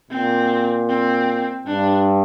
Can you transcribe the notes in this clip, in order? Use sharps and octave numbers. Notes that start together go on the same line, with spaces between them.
A#2 C4
C4
G2 D4